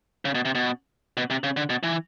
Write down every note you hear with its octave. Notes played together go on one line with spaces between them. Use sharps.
C#3
B2
C3
B2
B2
C3
C#3
D3
B2
E3